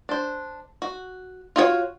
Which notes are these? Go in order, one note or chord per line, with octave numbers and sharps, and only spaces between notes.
D4 C5
F#4
F4 F#4 G#4 C#5